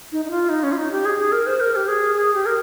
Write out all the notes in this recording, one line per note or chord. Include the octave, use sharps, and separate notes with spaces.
D#4
D#4
F4
D#4
C#4
F4
D#4
G4
G#4
G#4
A#4
C5
A#4
G4
G#4
G#4
G4
A#4